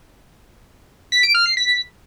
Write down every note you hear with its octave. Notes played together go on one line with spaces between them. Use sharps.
B6
D7
F6
C7
B6